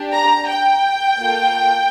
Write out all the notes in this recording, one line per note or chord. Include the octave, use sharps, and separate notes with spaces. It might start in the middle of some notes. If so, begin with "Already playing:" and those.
Already playing: D4 G4
A#5
G5
A#3 F4 A4